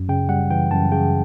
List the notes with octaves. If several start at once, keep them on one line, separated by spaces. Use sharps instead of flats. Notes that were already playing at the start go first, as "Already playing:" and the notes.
Already playing: F#2
C#3 G5
G3 F#5
E3 G5
F#2 A5
C#3 G5